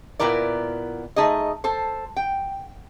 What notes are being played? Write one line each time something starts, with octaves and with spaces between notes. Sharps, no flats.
A#2 B3 E4 A#4 D5
A3 D#4 G#4 D#5
A4 C5
G5